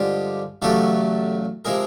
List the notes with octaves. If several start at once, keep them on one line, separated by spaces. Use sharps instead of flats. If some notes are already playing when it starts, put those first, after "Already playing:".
Already playing: G2 D3 F3 G#3 F4 G4
E2 C#3 F#3 A3 G4 A4
C3 F3 G#3 G#4 A#4